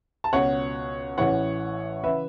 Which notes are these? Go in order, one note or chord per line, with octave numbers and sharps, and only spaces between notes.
A5
C#2 B2 C#5 F#5
A1 A2 E3 C#5 F#5
C#3 E3 B4 E5